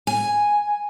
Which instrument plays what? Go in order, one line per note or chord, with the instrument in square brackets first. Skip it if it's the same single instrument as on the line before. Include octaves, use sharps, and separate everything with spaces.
[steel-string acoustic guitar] G#5